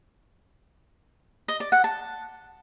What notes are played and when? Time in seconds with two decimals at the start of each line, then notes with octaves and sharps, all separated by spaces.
1.48 D#5
1.60 D5
1.72 F#5
1.84 A5